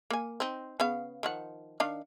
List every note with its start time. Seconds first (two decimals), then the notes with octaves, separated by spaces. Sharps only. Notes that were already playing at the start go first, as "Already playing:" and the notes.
0.10 A#3 G#5
0.40 C4 D#4
0.80 C#3 B3 F5
1.23 D#3 F3 F#5
1.80 D#3 D4 F5